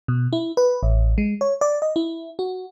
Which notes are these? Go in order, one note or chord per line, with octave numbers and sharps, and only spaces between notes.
B2
E4
B4
A1
G#3
C#5
D5
D#5
E4
F#4